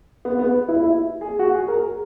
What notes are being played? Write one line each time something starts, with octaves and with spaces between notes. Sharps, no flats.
B3
B3
E4
E4
G#4
F#4
G#4
A#4
G#4